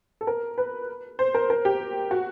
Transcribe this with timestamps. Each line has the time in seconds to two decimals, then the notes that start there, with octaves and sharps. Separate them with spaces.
0.21 A4
0.27 A#4
0.58 B4
1.19 C5
1.35 A#4
1.50 A#4
1.65 G4
2.11 F#4